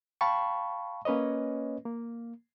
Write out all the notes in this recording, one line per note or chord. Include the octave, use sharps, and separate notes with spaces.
F5 G5 A5 B5 C#6
A#3 C#4 B4 C#5 D#5
A#3